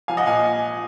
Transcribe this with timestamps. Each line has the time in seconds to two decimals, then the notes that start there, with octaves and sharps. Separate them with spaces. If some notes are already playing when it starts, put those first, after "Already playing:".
0.08 F3 F5 G#5
0.17 D#5 F#5
0.26 A#2 F5 G#5